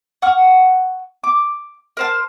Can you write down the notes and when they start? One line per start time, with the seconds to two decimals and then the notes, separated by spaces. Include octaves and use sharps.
0.22 F#5 C#6 F6
1.24 D6
1.97 A#4 C5 A5